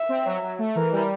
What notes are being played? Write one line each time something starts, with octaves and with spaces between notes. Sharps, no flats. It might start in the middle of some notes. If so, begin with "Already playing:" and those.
Already playing: E5
C4
F#3
F#3
A3
E3 A#4
G3